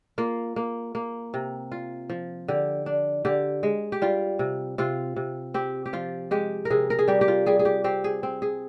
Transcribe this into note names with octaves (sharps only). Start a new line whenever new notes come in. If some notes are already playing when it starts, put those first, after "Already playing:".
A#3 F4
A#3
A#3
C3
F4
F3
D3 G4
D4
D3 G4
G#3
G4
G3 F4
C3
C3 F4
C3
C4 G4
G4
F3 F4
G#3 G4
A#4
C3 G#4
A#4
G#4
G3 G4
G4
F4
G3 G#4
G#4
G4
C4 G4
G#4
C4
G#4